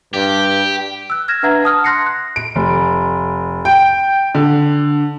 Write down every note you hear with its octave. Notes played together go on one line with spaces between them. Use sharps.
G2 G4
E6 F#6
F6 G#6 A#6 E7
D4 B4 E5 F#5 A#5 G#6
F#5 A5 D#6 F6
C6 F#6 A#6 C7 C#7
F#6
D7
F1
G5
D3